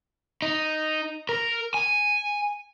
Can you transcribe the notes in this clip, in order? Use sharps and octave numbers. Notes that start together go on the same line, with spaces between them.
D#4
A#4
G#5